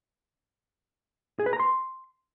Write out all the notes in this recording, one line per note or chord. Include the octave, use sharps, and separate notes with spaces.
G#4
B4
A#5
C6